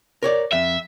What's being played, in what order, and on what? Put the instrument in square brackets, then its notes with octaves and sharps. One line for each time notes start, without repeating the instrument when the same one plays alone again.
[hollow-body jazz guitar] A#4 C#5 D5
[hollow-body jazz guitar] F2 [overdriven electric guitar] E5